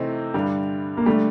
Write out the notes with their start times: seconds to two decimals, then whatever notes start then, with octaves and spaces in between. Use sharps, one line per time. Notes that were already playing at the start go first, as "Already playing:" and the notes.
Already playing: C3 E3 A3 C4 D#4
0.34 G2 D3 G3
0.97 A#3
1.06 D3 G3 A3